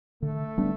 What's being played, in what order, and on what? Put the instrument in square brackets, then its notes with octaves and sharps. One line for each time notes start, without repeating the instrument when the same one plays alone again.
[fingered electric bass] D3 [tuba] A3
[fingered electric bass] G3 B3 D4